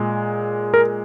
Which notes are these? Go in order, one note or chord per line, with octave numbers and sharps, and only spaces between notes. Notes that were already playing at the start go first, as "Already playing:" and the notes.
Already playing: A#2 G#3
A#4